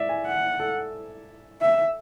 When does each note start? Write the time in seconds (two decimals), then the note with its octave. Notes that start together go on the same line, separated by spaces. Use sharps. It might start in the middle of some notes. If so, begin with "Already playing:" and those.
Already playing: D5 E5
0.09 G#5
0.26 F#5
0.60 A4
1.61 E5